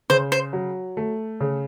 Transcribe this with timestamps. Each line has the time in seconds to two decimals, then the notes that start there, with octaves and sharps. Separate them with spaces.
0.10 C#3 C5
0.32 C5
0.53 F#3
0.97 A3
1.41 C#3